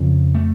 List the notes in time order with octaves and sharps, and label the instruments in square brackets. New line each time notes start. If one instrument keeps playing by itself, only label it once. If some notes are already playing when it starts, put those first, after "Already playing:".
Already playing: [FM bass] F2 [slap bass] C#3
[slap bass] A3